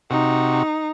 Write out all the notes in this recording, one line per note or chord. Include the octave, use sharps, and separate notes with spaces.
C3 D#4 F#4